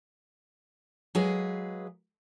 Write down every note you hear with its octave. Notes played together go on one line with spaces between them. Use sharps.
F#3 G#3 G#4 B4 F5